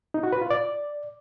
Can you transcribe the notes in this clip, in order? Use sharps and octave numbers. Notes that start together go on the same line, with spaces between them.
D#4
F#4
B4
F4
D5